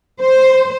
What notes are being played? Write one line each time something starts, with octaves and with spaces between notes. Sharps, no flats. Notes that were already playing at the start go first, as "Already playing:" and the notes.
C5